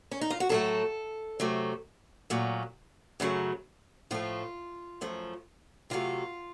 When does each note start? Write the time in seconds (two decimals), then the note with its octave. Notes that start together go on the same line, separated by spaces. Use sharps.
0.11 C#4
0.21 D#4
0.30 F4
0.40 F#4
0.49 A2 F#3 A3 A4
1.40 C3 F#3 A3
2.30 A#2 F#3 A3
3.20 F#2 C#3 F#3 A3
4.11 A2 F3 A3 F4
5.01 F#2 F3 A3
5.90 C3 F#3 A3 F4